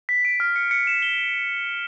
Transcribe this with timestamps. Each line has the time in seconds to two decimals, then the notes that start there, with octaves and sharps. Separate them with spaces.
0.09 B6
0.25 D7
0.40 F6
0.56 C#7
0.71 C#7
0.87 E7
1.02 G7